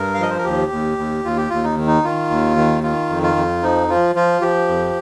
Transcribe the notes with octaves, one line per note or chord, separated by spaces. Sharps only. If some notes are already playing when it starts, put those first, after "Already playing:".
Already playing: G2 A#4
F5
F3 D#5
C5
A#4
D#2 G4
D#2
D#2
D#2 F4
G4
D#2 F4
D#4
D#3
D#4
D#3 F4
D#2
D#3
D#3 F4
F2
F4
F2
F3 D#4
F3 F4
F3 F4
F3 G4
F2